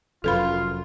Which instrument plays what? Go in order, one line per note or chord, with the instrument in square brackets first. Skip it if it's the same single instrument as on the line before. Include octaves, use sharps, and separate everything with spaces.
[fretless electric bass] F1 F#2 [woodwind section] F4 [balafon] A4 B4 B5